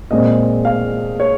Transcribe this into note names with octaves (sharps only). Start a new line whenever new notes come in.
A#2 G#3 C4 D#5
F5
C#5